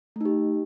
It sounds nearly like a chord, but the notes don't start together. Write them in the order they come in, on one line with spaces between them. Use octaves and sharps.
A3 D#4 G4